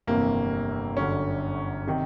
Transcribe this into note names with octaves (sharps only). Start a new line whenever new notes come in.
G1 F2 C3 E3 A#3
G1 F#2 D3 C#4
C3 D#3